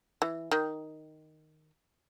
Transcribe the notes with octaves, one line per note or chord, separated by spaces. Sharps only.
E3
D#3